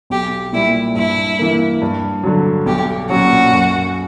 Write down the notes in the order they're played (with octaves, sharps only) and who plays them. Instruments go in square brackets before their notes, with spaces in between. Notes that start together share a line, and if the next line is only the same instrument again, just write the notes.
[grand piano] B1 [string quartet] G4
[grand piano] A#2 G3 [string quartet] E4
[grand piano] G2 [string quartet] E4
[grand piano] E3 A#3
G2
D3 F#3
[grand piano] B1 [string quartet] G4
[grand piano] A#2 F#3 C#4 [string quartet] F#4
[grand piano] F#2